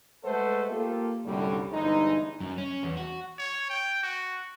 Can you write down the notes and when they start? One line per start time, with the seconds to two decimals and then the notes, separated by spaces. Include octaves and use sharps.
0.24 G#3 A3 A4 B4 C5 F#5
0.70 A#3 F4 G4 A4
1.25 C2 F#2 A2 D3 G3
1.72 G1 E3 G#3 D#4
2.40 F#2
2.58 C#4
2.83 E2
2.97 F#4
3.38 C#5
3.70 G5
4.03 F#4